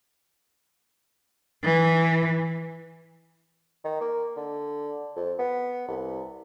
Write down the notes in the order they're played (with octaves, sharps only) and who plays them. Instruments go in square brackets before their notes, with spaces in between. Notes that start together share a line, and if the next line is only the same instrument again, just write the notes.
[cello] E3
[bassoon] D#3
A#3
D3
F2
B3
C2